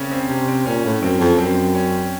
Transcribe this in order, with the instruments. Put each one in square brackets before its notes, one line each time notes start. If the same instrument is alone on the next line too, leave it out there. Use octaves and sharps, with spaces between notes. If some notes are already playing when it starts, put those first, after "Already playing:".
Already playing: [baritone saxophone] C#3 [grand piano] A#3 C4 C#4
[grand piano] C4
[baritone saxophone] C3 [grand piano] C#4
[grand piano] C4
[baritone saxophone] A#2 [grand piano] C#4
[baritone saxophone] A2
[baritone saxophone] F#2 [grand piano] C4
[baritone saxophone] F2
[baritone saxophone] F#2 [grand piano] C4
[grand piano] C#4